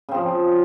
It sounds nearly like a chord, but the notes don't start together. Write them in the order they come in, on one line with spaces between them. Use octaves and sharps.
C#3 C4 F3